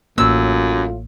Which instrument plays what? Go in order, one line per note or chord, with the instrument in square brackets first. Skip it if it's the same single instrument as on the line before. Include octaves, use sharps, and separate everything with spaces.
[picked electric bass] A1 A#3 [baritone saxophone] F#2 [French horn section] A2 F4 [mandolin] E6